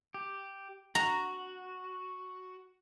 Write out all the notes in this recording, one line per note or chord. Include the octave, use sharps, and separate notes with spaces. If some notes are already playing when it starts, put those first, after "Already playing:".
G4
F#4 A#5